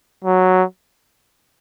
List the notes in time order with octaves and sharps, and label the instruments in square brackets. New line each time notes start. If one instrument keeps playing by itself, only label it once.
[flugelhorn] F#3